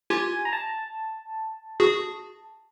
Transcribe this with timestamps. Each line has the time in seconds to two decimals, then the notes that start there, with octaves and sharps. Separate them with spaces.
0.10 F4 G4 G#5
0.45 A#5
0.53 A5
1.80 F#4 G#4